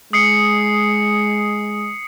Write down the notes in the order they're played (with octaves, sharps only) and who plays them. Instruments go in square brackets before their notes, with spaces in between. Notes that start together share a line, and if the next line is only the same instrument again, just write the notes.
[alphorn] G#3 [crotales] D#6 C7 C#7